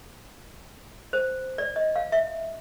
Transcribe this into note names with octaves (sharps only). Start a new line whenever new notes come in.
C5
D5
D#5
F5
E5